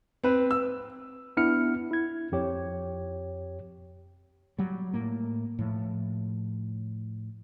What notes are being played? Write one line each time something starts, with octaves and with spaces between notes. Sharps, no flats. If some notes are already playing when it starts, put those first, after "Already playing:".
C4 B4
E6
B3 D4 E4 F6 C#7
E4 G#6
F2 G4 C#5
F#3 G3
A2 A#3
A2 F3